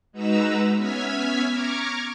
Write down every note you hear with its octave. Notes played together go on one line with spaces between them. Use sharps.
G#3 D#4 F#4 B4 A#5 E6
B3 C#4 E5 F6 G#6 B6
A#5 C#6 D6 F6 G#6